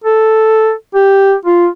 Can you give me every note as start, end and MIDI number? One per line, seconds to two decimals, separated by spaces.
0.04 0.73 69
0.95 1.34 67
1.45 1.67 65